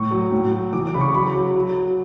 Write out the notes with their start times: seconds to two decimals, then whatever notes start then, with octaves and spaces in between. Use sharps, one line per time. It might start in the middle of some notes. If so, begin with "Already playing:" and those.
Already playing: A2 C#6
0.11 F#3
0.31 A2
0.52 F#3
0.73 E3 D6
0.87 D6
0.94 C#3 B5
1.01 C#6
1.14 F#3 B5
1.34 F#3
1.56 F#3
1.76 F#3